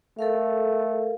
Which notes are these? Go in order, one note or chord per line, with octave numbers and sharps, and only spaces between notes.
A3 A4 A#4 F5